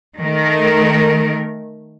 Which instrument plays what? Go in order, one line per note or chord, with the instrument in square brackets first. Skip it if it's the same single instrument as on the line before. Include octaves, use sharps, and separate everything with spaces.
[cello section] D#3 A3 A#4